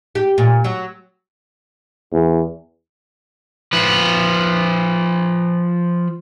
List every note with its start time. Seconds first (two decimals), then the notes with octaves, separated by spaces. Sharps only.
0.15 G4
0.38 A#2
0.64 F#3
2.13 E2
3.73 F3 B4